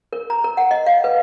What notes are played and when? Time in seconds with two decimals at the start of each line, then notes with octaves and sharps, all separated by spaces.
0.13 A#4
0.30 A#5
0.44 A#4
0.57 F#5
0.71 D#5
0.86 F5
1.04 B4